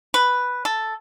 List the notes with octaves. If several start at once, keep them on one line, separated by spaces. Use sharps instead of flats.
B4
A4